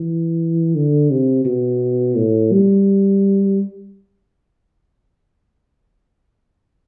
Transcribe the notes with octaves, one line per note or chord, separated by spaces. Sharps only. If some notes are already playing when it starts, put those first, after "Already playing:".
Already playing: E3
D3
C3
B2
A2
G3